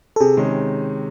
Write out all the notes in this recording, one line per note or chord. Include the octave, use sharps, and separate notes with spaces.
A4
C3 G#4
D#3 G#3 C#4